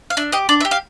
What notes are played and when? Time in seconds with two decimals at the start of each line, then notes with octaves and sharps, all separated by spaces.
0.10 F5
0.17 D4 E5
0.32 G4 D#5
0.49 D4 D5
0.61 E5
0.65 G4
0.71 F5